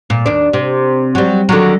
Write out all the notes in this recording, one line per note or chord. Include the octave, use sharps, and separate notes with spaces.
A#2
D#2 D4
C3
F#3 G3
D3 D#3 F#3